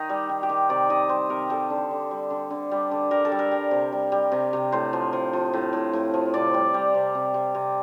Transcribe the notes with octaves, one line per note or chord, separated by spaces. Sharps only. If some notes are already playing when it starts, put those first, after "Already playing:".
Already playing: D#3 D#4
G3
D#3
G4
D#3
C3 D5
D#3 D#5
G3 C5
C3 A#4
G3 A4
D3
D3
G3
D3
D3
G3
D3
G3 A#4
A4
G3
A#4
G3
C3
G3
G3
C3
C3
A2 C5
F3
F3
F3
A2
A2
A2
F3
C3 D5
G3
G3
C3
C3
C3
C3